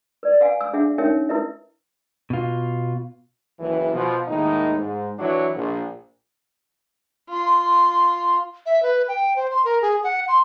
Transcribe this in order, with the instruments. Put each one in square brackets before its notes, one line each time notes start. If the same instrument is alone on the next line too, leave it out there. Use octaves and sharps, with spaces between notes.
[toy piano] B4 D5
B4 F5 F#5 G#5
E6
D4 G#4 E5 F#5
C#4 D#4 A#4 C#5 E5 G5
E4 A#4 B4 D#5 E5
[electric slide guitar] B2 F4
[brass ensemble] F#1 E3
B2 F3
D#2 A2 D#3 G#3 D#4
G#2
E3 F#3 D4 E4 F#4 C#5
A#1
[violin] F4 C6
[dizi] E5
B4
G5
C5
C6
A#4
G#4
F#5
C6